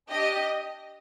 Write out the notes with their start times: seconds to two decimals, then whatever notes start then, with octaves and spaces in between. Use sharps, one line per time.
0.10 D4 G4 D#5